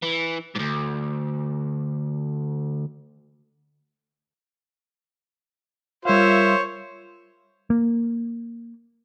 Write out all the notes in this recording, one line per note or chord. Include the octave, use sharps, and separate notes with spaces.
E3
D2 G#2
G3 F4 A#4 C5 C#5 E5 F5
A#3